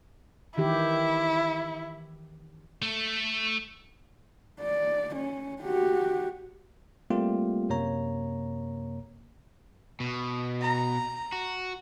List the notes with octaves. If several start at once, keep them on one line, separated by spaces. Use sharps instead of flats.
D#3 E3 E4 G4
A3
D5
C#4
F#4 G4
G3 A3 A#3 C4 F4 G4
F#2 C3 A#3 C#5 A#5
B2
A#5
F#4